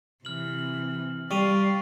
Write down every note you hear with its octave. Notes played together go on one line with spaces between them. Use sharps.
C3 E3 F6 F#7
G3 D5 F5 C#6 D#7 F7